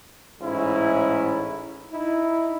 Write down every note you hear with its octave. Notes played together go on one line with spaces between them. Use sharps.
A1 G#2 C#4 E4
D#4 E4